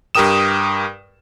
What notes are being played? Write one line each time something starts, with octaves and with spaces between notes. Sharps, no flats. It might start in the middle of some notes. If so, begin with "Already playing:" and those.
G2 G4 A#4 G5 D#6 E7